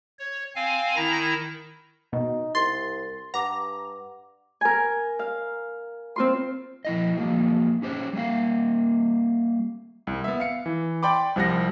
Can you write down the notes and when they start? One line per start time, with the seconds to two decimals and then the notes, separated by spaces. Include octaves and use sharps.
0.19 C#5
0.56 C4 F5 G#5
0.96 D#3 E4 A#5 A#6
2.13 B2 D#4
2.55 C2 C6 A6
3.34 G2 F#5 A#5 D6
4.61 A#4 G#5
5.19 F5
6.16 C4 F4 C6
6.85 F3 E4 D#5
7.17 F3 F#3 G#3 A#3
7.82 C#4 G4 C5 C#5
8.13 G3 A#3 F5
10.07 C2
10.24 B3 E5
10.40 F5 C#7
10.66 E3
11.03 D5 G5 B5 C6 D6
11.36 C2 F3 G3 F#5 A#6